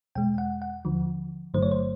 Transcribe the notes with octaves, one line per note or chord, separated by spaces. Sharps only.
E2 B2 G#3 G5
F#5
F#5
D#2 D3 F3
G1 G2 D3 F#3 A3 C5
C#5
C5